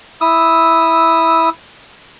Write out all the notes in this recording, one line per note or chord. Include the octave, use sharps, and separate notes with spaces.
E4 D#6 E6